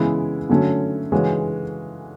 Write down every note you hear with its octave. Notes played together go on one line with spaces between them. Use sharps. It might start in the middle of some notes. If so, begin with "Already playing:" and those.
Already playing: C#3 E3 G#3 B3 E4
D3 F#3 A3 C#4
C#3 E3 G#3 C#4 F#4